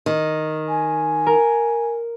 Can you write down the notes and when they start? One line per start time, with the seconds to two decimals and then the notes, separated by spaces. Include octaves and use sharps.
0.06 D#3
0.68 G#5
1.26 A#4